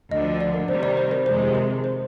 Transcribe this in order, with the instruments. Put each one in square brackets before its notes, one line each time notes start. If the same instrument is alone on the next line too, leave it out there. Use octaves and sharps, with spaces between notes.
[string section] D2 D3 F3 [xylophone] D#5
[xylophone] D5
A#4
[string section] C3 D#3 G3 [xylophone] C5
[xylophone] D5
C5
A#4
[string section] F2 C3 D#3 G#3 [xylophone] C5
[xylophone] A#4
C5